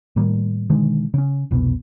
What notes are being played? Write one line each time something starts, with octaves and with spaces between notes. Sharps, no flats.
A2 D#3 G3 A#3
B2 D3 D#3 G#3
C#3 C#4
F1 C2 B2